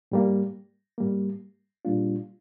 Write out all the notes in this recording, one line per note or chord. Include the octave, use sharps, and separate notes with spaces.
G#2 G3 A#3
G#2 G3 A#3
A#2 G3 A#3 D4 F4